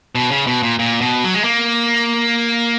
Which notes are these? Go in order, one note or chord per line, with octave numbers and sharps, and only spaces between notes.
B2
C#3
B2
A#2
A#2
B2
F#3
G#3
A#3